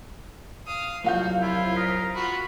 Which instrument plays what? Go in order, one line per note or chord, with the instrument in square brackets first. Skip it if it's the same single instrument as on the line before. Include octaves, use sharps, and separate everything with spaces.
[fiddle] F5 D#6
[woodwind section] C2 F#3 [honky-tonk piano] F3 F5 G6 [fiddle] F#4
[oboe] E4 [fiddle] F4
[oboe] A#4 [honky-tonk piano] D#6 B6
[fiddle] F4 F#4 [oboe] B5